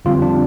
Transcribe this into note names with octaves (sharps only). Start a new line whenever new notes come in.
F2 D3 G3 C4 F4
D4